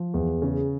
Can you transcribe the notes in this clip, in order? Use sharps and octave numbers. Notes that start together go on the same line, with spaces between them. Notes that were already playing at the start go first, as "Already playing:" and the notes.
Already playing: F3
E2
C#3